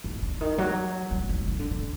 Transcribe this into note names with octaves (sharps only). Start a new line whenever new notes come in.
D#3
D3
D#3
F#3
F#3
D#3
D#3
D3
D3